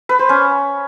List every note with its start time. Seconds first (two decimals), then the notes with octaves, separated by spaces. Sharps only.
0.09 B4
0.19 C5
0.29 C#4